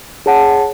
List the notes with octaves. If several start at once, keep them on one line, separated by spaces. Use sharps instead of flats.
G#4 C#5 F#5 A5